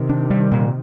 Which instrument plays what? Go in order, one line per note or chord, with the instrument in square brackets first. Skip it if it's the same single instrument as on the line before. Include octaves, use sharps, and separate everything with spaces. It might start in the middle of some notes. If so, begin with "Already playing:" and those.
Already playing: [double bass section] C3 D#3
[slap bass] D4
G3
A#2